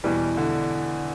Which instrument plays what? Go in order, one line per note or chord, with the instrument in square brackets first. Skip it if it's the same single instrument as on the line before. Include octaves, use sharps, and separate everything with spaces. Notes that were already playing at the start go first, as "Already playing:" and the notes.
[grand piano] E2 B2 G3 [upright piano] E3
[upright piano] D3